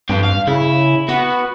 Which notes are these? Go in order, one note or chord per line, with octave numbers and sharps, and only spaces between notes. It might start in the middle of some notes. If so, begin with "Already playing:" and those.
G2 F3 C4
F5
C#3 E4
B3 F#4